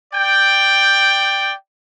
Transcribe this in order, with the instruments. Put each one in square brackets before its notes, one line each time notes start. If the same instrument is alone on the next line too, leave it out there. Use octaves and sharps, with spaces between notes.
[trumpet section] D5 G5